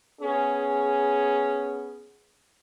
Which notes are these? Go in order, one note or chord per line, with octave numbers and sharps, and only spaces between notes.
B3 C#4 G#4